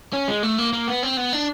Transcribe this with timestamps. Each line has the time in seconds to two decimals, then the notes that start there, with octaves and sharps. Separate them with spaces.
0.14 C#4
0.28 G#3
0.43 A3
0.58 A#3
0.73 A#3
0.88 B3
1.03 C4
1.17 B3
1.33 D4